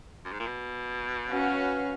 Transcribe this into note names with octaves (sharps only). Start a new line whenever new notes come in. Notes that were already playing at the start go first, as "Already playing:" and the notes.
F#2
G#2
A#2
B2
C#4 F#4 B4 F5